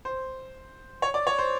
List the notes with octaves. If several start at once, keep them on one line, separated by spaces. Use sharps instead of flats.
C5
C#5
D5
C#5
C5